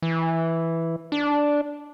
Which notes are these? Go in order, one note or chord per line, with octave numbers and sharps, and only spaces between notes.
E3
D4